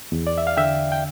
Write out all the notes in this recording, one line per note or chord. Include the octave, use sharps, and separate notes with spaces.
E2
D5
E5
F5
D3 E5 G5
G5